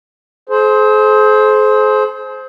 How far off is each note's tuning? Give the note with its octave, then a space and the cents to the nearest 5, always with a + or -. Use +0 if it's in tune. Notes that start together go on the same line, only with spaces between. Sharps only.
G#4 +45 C5 +0